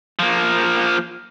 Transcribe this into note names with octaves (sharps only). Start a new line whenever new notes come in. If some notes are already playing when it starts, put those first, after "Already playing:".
F3 A#3